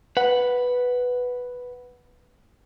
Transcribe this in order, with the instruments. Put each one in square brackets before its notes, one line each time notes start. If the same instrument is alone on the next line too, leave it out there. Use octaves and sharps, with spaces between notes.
[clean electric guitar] B4 F#5